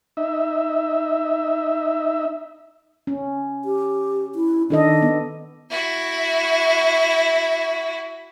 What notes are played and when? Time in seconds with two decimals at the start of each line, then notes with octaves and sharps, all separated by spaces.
0.17 D#4 E5
3.07 C#4
3.65 G4
4.35 E4
4.70 D#3 D4 A4 D#5
5.02 B3
5.70 E4 F#4